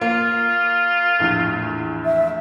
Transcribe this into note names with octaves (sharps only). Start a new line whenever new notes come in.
A#3 F4
A#1 E2 A2
E5